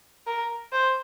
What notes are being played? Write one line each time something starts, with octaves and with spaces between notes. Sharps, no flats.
A#4
C5